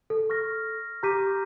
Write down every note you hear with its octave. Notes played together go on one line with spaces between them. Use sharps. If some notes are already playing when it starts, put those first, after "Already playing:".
A4
C#6 F6 A#6
G4 A#5 D6 G6 B6 D#7